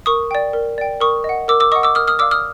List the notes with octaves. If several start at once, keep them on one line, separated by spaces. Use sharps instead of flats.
A#4 C#6 D#6
D5 G5
A#4
D5 G5
A#4 C#6 D#6
D#5
F#5
A#4 D6 E6
D6 E6
D#5 F#5 C#6 D#6
D6 E6
A#4 D#6 F6
D#6 F6
D5 F5 D6 E6
D#6 F6